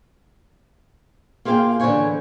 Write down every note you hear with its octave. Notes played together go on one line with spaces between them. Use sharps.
A#3 F4 G#4 F5 G5
D3 E3 F4 C5 C#5 G#5